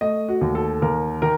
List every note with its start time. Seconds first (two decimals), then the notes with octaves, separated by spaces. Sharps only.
0.01 A3 D#5
0.29 F#4
0.41 D#2
0.55 A4
0.82 D#2 A#4
1.22 D#3 A#4